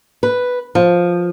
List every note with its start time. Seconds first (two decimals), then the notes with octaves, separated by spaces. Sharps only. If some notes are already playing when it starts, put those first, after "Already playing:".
0.23 B4
0.75 F3